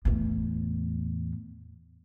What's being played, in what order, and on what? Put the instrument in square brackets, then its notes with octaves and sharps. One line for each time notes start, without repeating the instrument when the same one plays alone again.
[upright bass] E2 A2